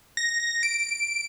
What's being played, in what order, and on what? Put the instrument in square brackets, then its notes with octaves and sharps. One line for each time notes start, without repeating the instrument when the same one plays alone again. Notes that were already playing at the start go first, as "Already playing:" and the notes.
[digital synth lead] A#6
D7